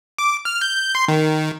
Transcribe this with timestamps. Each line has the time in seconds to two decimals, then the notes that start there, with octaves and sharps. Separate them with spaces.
0.18 D6
0.45 F6
0.61 G6
0.95 C6
1.08 D#3